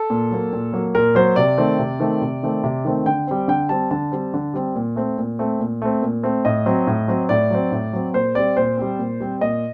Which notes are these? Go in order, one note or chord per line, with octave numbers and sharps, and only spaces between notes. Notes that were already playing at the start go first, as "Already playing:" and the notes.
Already playing: A4
A#2
F#3 A#3
A#2
F#3 A#3
A#2 A#4
F#3 A#3 C5
C3 D5
D#3 A3 C4
C3
D#3 A3 C4
C3
D#3 A3 C4
C3
D#3 A3 C4
D3 G5
G3 C4
D3 G5
G3 C4 A5
D3 A5
G3 C4
D3
G3 C4
A#2
A3 C4
A#2
A3 C4
A#2
A3 C4
A#2
A3 C4
A2 D#5
F#3 C4
A2
F#3 C4
A2 D5
F#3 C4
A2
F#3 C4
A#2 C5
G3 C4 D5
A#2 C5
G3 C4
A#2
G3 C4
A#2 D#5